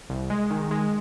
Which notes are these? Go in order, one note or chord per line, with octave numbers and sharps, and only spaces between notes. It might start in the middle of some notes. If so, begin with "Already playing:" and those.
C2
G#3
D#3
G#3